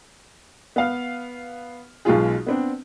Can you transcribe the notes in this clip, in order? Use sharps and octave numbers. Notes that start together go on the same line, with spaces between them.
B3 F5 F6
B1 B2 G#3 F4 G#4
B3 C4 D4